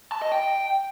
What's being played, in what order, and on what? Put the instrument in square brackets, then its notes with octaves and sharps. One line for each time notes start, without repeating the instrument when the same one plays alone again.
[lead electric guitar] A5
D#5
G5